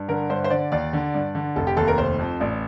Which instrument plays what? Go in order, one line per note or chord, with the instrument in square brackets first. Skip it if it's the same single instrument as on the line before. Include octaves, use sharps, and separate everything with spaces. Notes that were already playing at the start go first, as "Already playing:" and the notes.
Already playing: [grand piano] G2
[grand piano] D3 [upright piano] A#4
[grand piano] G2 [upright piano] C5
[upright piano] C5
[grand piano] D3 [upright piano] D5
[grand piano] D#2 [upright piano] D5
[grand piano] D3
G2
D3
[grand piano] F1 [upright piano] A4
[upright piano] G4
[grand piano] D#2 [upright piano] A4
[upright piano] A#4
[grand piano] F1 [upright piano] C5
[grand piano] F2
[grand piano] A1 [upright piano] D5